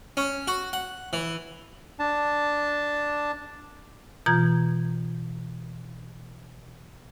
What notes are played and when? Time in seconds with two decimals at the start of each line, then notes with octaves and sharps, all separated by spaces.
0.17 C#4
0.47 F#4
0.73 F#5
1.13 E3
1.99 D4 A5
4.26 B2 E3 F4 A#5 G6 G#6